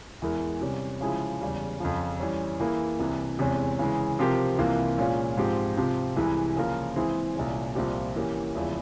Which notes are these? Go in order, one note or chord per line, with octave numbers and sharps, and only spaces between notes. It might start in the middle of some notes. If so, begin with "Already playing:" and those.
E2 E3 G#3 E4 A#4
C3 G3 C#4 G4
C#3 F3 G#3 E4 G#4
E2 C#3 G3
F2 C#3 F3
E3 G3 C#4
E3 A#3 E4 G#4
C2 C3 E3
E2 C3 E3 G#3 C#4
C#3 E3 G#3
C3 F3 C4 G4 A#4
C2 C3 E3 A#3 F4
A#2 G#3 C#4 F4
G#2 F3 C4 G4
C3 F3 C4 G4
C2 C3 E3 G#3 E4
C#3 F3 A#3 F4 A#4
E3 G#3 C4 E4 G#4
C2 A#2 G#3 C#4
C2 A#2 F3 C4 G4
E3 A#3 C#4 G4
E2 C#3 F3 G#3 E4